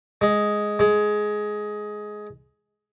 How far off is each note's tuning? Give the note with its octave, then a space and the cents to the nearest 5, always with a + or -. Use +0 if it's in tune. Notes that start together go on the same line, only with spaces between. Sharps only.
G#3 +5
G#3 +15